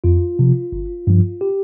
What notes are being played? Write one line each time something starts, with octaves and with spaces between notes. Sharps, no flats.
F2 F4
C3 F3
G1
G2 F3
G4